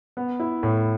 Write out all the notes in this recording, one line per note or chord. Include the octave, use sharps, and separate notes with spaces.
B3
E4
A2